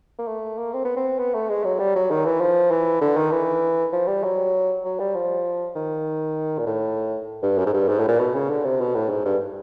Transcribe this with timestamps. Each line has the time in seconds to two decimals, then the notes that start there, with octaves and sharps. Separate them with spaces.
0.18 A#3
0.27 A3
0.58 A#3
0.73 C4
0.84 B3
0.96 C4
1.19 B3
1.34 A3
1.49 G#3
1.64 F#3
1.79 G3
1.95 F#3
2.11 D#3
2.25 E3
2.40 F3
2.71 E3
3.01 D3
3.16 D#3
3.32 E3
3.92 F3
4.08 G3
4.23 F#3
4.84 F#3
4.99 G3
5.15 F3
5.75 D#3
6.58 A#2
6.66 A2
7.43 G2
7.58 F#2
7.66 G#2
7.73 G2
7.88 G#2
7.99 A2
8.08 A#2
8.19 B2
8.34 C#3
8.50 D3
8.64 C3
8.80 B2
8.95 A2
9.10 G#2
9.25 G2